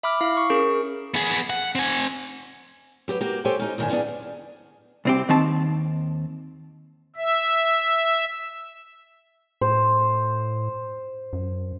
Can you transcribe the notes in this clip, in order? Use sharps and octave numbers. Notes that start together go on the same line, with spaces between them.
E5 B5 D6 F6
E4 F5
C#6
C#4 G#4 A#4
B3 G#4
F#5
C4 G#5
F#3 G4 A#4 B4
A#3 F#4 G4
G4 A4 C5 C#5 G5 G#5
C#4 D#4
D2 A2 D#3 F#4 E5 G#5
B3 C#4 D4 G#4 F#5
C2 C4 G4
D#2 D#3 C4 A5
E5
A2 C5
F#2